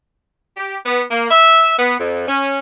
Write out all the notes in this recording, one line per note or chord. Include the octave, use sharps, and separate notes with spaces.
G4
B3
A#3
E5
B3
F2
C#4